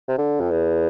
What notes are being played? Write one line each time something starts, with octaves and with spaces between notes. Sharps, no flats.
C3
D3
F2
E2